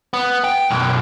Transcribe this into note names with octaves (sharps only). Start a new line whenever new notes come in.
B3
G5
B1 F#2